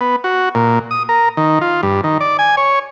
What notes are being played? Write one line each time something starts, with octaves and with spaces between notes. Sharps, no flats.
B3
F#4
A#2
D#6
A#4
D#3
F4
G2
D#3
D5
G#5
C#5